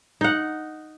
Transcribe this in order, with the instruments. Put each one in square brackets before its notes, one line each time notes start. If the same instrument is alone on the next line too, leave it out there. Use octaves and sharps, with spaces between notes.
[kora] D#4 F#5